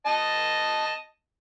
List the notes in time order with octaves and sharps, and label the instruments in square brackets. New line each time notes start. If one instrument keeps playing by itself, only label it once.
[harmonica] D#5 A5